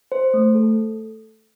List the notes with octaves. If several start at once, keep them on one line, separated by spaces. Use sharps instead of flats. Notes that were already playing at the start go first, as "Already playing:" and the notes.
C5
A3
A4